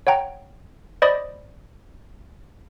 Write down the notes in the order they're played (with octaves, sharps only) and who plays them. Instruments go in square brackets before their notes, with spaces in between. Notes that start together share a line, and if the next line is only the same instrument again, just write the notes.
[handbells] C#5 F#5 G5 A#5
C5 D5 D#5 B5 D#6